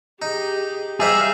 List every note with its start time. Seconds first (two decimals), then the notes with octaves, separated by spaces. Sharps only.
0.22 D#4 G4 G#4
1.00 G3 D#4 G#4 C5 E5 F5